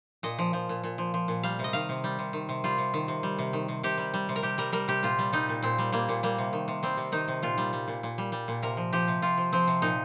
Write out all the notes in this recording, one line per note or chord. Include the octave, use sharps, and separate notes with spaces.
A#2 D#5
F3
F3
A#2
A#2
F3
F3
A#2
G3 F5
C3 D#5
D#3 F5
C3
G3
C3
D#3
C3
G3 F4
C3
D#3
C3
G3
C3
D#3
C3
C3 G4
G3
G3
C3
A#4
C3 G4
G3 A#4
G3 A#4
C3 G4
A#2 F4
G3
G3 D#4
A#2
A#2 C4
G3
G3 A#3
A#2
G3 A#3
C3
D#3
C3
G3 C4
C3
D#3 D#4
C3
A#2 F4
G3
G3
A#2
A#2
G3
G3
A#2
C3 A#4
F3
F3 G4
C3
C3 F4
F3
F3 C4
C3
A#2 D#4